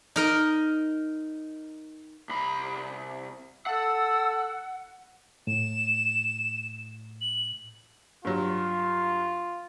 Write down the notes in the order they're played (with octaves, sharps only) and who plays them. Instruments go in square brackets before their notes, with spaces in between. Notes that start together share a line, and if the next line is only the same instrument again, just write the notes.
[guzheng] D#4 A#4 D#5
[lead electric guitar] C2 B5
[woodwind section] A4 A5 E6 [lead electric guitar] F#5
[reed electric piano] A2 [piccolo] E7
[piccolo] F#7
[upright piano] G2 F#3 G3 [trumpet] F4